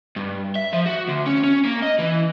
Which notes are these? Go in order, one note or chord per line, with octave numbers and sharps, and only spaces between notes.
G2
E5
F3
F#4
D2
C#4
C#4
A#3
D#5
E3